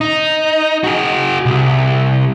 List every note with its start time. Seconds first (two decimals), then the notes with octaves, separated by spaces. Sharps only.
0.01 D#4
0.84 F#4 G#4
1.46 C2